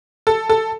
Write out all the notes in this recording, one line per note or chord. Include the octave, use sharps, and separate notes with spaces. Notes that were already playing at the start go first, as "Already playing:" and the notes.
A4
A4